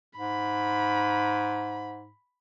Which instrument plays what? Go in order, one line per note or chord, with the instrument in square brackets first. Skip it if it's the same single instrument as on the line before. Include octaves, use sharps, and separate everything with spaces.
[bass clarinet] G#2 [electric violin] B5